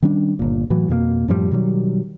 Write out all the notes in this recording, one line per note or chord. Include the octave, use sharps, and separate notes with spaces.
D#3 G3 C#4 D4
G1 A#2
A2 E3 F#3
F2 B2 G#3 A#3
F#2 A2 F3 G3
B2 D#3 F#3 G3